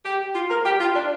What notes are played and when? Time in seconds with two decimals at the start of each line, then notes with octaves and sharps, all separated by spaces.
0.05 G4
0.35 F4
0.50 A#4
0.66 G4
0.80 F4
0.95 D4